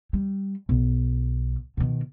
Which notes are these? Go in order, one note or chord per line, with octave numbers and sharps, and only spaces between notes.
G3
B1
B2 D#3